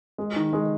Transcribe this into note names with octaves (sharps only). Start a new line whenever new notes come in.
G#3
D#3
G#3